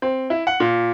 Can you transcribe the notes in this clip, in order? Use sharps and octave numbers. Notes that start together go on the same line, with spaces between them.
C4
E4
F#5
A#2